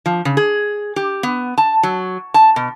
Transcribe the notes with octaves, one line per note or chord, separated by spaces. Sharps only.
F3
C#3
G#4
G4
B3
A5
F#3
A5
B2